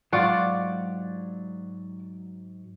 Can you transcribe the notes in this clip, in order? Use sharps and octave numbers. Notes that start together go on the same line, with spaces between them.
G#2 F#3 F4 D5 F#5 C#6